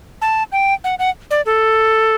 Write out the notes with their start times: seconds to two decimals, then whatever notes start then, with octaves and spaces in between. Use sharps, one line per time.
0.22 A5
0.52 G5
0.84 F#5
0.99 F#5
1.31 D5
1.46 A4